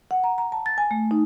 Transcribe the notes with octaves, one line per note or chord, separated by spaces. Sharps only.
F#5
A#5
A#5
A5
A6
G#5
A3
D#4